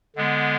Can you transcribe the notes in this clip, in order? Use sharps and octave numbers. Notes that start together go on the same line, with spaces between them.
D3 G#3 B3